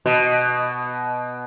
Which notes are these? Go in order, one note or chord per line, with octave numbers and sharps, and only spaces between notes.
B2